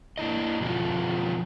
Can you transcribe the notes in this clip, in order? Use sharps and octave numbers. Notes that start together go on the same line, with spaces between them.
A#3 D4 E4 D#5
B2 F3 C4 F4 F#4